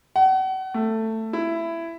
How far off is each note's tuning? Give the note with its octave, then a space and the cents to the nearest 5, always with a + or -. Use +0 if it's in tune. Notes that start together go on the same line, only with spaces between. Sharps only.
F#5 +40
A3 +15
E4 +15